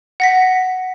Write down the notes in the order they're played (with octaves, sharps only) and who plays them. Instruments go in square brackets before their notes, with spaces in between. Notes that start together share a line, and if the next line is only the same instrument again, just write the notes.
[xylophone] F#5 A#6 B6